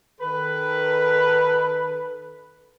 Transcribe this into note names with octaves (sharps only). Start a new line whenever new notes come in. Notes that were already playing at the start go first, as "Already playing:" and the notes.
D#3 A4 B4